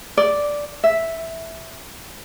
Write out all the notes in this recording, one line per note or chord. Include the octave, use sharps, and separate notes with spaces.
D5
E5